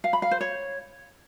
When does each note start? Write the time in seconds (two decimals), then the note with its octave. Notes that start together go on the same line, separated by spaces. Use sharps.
0.04 F5
0.13 B5
0.22 F5
0.31 C5
0.41 C#5